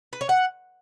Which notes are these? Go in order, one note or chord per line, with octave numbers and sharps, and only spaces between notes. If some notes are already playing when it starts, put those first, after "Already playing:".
B4
C#5
F#5